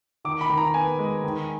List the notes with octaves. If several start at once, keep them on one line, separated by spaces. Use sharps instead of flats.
D#3 D6
B5
D#3
A#5
B3 G#5
G#3
D#3